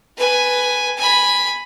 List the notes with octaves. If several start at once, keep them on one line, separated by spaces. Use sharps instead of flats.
B4 G#5
G#5 B5